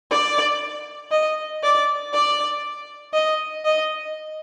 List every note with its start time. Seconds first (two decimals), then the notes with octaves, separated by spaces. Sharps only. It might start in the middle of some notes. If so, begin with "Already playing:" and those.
0.11 D5
1.11 D#5
1.63 D5
2.13 D5
3.14 D#5
3.65 D#5